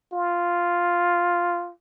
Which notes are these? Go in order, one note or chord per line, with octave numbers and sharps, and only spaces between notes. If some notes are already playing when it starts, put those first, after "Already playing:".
F4